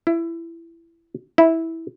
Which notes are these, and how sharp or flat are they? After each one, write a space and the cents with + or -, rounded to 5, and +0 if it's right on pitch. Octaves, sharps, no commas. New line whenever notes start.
E4 +20
E4 -10